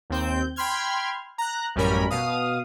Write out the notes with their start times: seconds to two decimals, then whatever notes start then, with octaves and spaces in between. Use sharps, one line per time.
0.10 D#2 C4 G6
0.56 G5 B5 C6 F6 G#6
1.38 A#5 F#6
1.76 A1 F#2 G3 C#4 A#4 B5
2.10 B2 F5 D#6